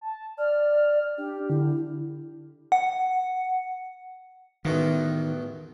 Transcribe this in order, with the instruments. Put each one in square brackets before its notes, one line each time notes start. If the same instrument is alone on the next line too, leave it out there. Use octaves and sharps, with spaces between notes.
[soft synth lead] A5
[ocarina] D5 [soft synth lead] F6
[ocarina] D4 [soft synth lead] G4
[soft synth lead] D3 [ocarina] E4
[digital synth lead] F#5
[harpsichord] A1 E2 B2 [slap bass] D#3